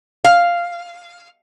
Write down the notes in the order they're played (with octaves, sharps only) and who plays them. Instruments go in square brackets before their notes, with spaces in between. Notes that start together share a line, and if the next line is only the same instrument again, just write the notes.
[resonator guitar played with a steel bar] F5